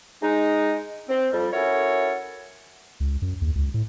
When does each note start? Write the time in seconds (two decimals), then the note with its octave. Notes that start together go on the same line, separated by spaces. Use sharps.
0.22 G#3 D#4
1.09 C4
1.32 F2 G3
1.53 C#4 E4 F#4 A4 A#4 C#5
3.00 C#2
3.22 F#2
3.42 D#2
3.55 C#2
3.74 A2